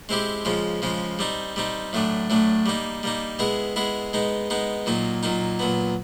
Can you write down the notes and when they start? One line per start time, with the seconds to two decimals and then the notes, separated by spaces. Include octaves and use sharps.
0.09 G#3 C4 E4 G4
0.45 C#3 F3 G#3 C#4
0.82 C#3 F3 G#3 C#4
1.19 G3 C4 D#4
1.56 G3 C4 D#4
1.93 A2 F#3 A3 D4
2.30 A2 F#3 A3 D4
2.66 G3 A#3 D#4
3.03 G3 A#3 D#4
3.39 G#3 B3 E4 G#4
3.76 G#3 B3 E4 G#4
4.13 G#3 B3 D#4
4.50 G#3 B3 D#4
4.86 A#2 F#3 A#3 D#4
5.23 A#2 F#3 A#3 D#4
5.59 A#2 F#3 B3